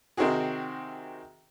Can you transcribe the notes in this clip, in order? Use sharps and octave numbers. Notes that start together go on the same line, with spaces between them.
C3 D#3 C4 D#4 F#4 G#4